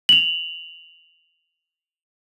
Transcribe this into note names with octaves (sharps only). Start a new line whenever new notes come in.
F7 F#7